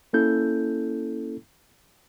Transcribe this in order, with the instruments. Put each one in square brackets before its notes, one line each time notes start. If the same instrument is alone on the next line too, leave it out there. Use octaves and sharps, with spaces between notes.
[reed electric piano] A#3 C#4 E4 A4 G6